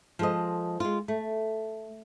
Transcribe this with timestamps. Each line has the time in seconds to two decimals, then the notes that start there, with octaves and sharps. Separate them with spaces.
0.19 F3 G#3 A4 C5 D#5
0.80 G#3 F4
1.08 A3